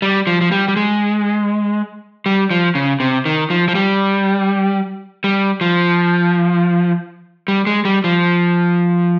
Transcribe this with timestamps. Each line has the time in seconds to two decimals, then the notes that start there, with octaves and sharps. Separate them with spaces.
0.02 G3
0.27 F3
0.41 F3
0.52 G3
0.68 G3
0.76 G#3
2.26 G3
2.51 F3
2.75 C#3
3.00 C3
3.26 D#3
3.50 F3
3.68 F3
3.75 G3
5.24 G3
5.61 F3
7.48 G3
7.67 G#3
7.85 G3
8.04 F3